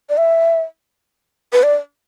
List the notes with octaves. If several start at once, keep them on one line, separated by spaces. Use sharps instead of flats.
D5
E5
B4
D5